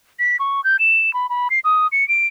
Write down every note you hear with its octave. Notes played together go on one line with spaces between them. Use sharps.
B6
C#6
G6
E7
B5
B5
C7
D#6
C#7
D7